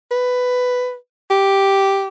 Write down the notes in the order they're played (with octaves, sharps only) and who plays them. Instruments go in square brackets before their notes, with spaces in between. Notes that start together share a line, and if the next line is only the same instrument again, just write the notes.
[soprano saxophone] B4
G4